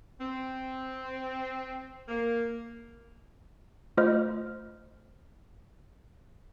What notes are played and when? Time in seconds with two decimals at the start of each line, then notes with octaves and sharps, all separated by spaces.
0.20 C4
2.08 A#3
3.97 A3 F4 C5 D#5 F6